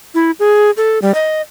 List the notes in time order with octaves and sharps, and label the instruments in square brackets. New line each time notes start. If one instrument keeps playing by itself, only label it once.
[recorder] E4
G#4
A4
G3
D#5